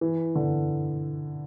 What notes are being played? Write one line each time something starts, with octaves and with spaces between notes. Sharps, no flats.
E3
D3